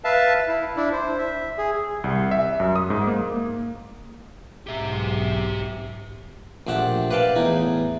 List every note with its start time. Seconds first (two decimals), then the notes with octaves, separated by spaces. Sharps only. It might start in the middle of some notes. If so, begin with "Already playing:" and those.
0.04 B4 E5 F5 A5
0.48 E4
0.76 D4 E4
0.92 C5
1.18 E5
1.58 G#4
2.04 C2
2.31 E5
2.60 F#2
2.76 D#6
2.90 G#2
3.07 A#3
4.67 B1 G#2 G4 E5
6.67 A#1 A3 G4 F#5 A5
7.11 B4 D5 F5 G5 A5
7.35 E2 A2 D#4